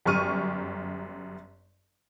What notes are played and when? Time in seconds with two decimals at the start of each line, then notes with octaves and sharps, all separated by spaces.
0.05 G1 F#2 G4 C#6 F6 D#7